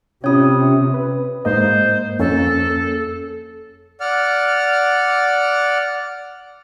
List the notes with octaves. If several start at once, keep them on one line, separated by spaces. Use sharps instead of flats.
C3 C#4 F4 C#5 D#6
B4
G#2 A#3 C5 D#5
F2 A#3 C#4 A4
D5 F#5 F6